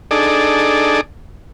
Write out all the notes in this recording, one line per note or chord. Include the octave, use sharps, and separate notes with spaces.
D4 D#4 G#4 A4 D5